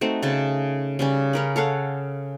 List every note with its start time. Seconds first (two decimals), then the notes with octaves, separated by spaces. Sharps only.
0.01 A3 C4 D#4 F#4
0.23 C#3 A3 A5
0.99 C#3 G3 C#4
1.33 C#4 A#4 B5
1.56 A4 C#5 F5 F#5